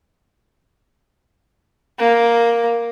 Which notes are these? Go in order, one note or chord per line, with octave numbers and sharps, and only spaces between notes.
A#3